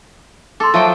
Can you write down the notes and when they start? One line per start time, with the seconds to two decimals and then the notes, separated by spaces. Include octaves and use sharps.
0.60 A4 C6 D6
0.74 F3 F#3 F4 E5 G5